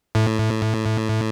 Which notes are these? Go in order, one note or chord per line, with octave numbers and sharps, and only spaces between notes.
A2